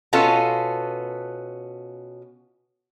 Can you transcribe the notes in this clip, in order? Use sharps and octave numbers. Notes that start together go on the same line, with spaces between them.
B2 B3 C#4 F4 A4